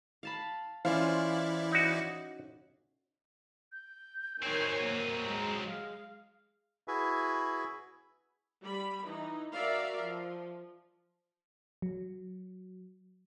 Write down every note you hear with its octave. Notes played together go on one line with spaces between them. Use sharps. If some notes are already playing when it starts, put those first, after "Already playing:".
F5 A5 B5
E3 C#4 E4 F4 C5 D5 F5
D#4 F#4
G6
D#3 F#3 C4 C#5 G#5
A#3 D#7
G#3 A#5
F5
E4 F#4 G#4 B4
G3 B5
E3 D#4
F#4 A#4 D5 E5 F5
F3
F#3